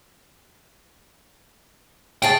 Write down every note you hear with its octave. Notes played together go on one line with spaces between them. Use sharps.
C#3 G#4 G5 A5